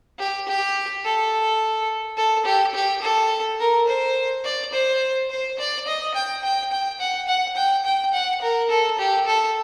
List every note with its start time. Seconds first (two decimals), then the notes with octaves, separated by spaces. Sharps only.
0.19 G4
0.48 G4
1.05 A4
2.17 A4
2.46 G4
2.74 G4
3.02 A4
3.60 A#4
3.88 C5
4.44 D5
4.73 C5
5.30 C5
5.59 D5
5.87 D#5
6.15 G5
6.44 G5
6.72 G5
7.00 F#5
7.28 F#5
7.56 G5
7.85 G5
8.14 F#5
8.42 A#4
8.70 A4
8.99 G4
9.27 A4